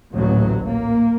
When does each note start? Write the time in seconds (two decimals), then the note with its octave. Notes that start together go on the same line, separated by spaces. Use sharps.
0.13 A1 D2 A#2 F#3
0.69 A#3